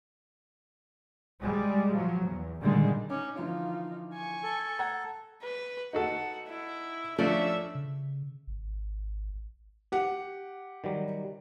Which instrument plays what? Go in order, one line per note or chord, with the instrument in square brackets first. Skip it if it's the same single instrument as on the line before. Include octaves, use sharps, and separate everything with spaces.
[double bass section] G3 G#3
F3 F#3
E2
A#2 D3 D#3 G3 G#3
[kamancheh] C#4 D#4 [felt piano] D6
[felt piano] D3 E3 F3 [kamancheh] D#4 F4
[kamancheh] G#5 C#6
[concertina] A4
[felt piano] F#5 A#5 G#6
[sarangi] B4
[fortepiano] D#4 F#4 A4 [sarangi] F#5
[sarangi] E4
[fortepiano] F3 A3 D4 [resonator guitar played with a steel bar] C#4 A4 D5 [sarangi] E5
[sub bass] C#3
G#1
[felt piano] G4 F#5
[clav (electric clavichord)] D#3 F#3 G3